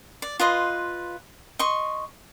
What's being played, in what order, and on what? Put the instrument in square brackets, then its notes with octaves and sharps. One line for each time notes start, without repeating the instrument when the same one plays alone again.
[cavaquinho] D5
F4 B4 D#5 C6
D#5 C6 C#6